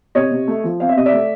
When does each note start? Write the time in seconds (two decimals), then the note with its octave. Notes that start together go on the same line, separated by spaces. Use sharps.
0.15 C3 C#5 D#5
0.31 C3
0.48 A3
0.64 F3
0.80 C4 F5
0.89 E5
0.96 C3 D#5
1.06 D5 E5
1.13 A3